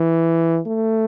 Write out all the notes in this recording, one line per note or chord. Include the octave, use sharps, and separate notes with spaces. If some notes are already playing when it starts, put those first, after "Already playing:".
Already playing: E3
A3